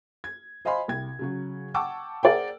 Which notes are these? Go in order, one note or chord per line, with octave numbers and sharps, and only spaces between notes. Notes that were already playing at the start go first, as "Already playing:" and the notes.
G#6
C5 D#5 F5 G#5 B5 C6
C2 G5 G#6
C#3 F#3 F#4
F#5 G5 A5 C#6 D6 E6
G#4 A#4 C5 D5 F#5 G5